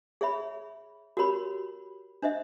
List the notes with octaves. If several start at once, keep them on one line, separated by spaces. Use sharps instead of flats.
G#4 C#5 E5 B5
F#4 G4 A#4 C#5 B5
D4 C5 D#5 E5